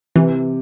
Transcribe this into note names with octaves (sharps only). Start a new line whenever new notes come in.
C3 E3